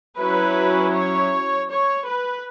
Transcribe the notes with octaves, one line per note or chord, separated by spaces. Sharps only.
F#3 C#4 E4 B4
C#5
C#5
B4